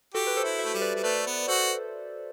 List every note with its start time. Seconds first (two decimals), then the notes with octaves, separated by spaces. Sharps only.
0.14 F#4 G4 A4
0.27 B4
0.37 A4 C5
0.44 E4
0.59 C5 E5
0.65 A3
0.74 G3
0.81 B4 D5
0.95 G3
1.04 A3 B4 D5
1.26 B3
1.48 F#4 A4 C5